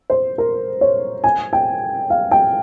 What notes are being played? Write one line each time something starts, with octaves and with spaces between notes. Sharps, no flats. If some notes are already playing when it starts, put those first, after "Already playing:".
C5
A#4
C#5
G#5
G5
F5
G5